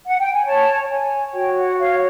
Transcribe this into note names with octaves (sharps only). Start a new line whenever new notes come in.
F#5
G5
G#5
C#5 A5
C#5 G#5
F#4 G5
F#5
C#5 F5